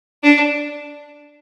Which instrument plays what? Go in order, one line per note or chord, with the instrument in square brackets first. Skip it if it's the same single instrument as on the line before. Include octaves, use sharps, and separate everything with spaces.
[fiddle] D4